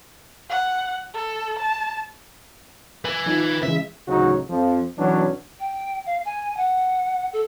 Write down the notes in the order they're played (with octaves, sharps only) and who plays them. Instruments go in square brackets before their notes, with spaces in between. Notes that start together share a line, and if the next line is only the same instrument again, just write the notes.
[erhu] F#5
A4
A5
[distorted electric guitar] B4 G#5
[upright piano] F3 D#4
[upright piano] C#3 E3 G#3 [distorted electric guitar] E5
[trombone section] A1 D2 C#3 F#3 D#4 F#4
F2 F3
B1 E3 F#3 B3 C#4 D4
[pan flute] G5
F5
G#5
F#5
A4